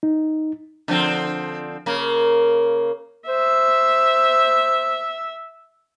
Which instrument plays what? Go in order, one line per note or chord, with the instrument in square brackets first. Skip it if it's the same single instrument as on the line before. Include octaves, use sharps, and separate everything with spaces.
[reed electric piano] D#4
[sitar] D3 F3 C4
C#3 A#3
[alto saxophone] C5 [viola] E5